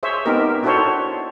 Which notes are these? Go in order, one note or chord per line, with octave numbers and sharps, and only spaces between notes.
G#4 C5 C#5 E5
B3 C4 D#4 G4 A#4
D4 E4 F#4 A4 C5 C#5